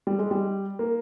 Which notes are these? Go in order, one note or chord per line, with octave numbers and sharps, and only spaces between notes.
G3
G#3
G3
A#3